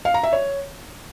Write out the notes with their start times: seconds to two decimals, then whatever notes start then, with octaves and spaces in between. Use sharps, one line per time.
0.05 F5
0.14 A#5
0.23 E5
0.33 C#5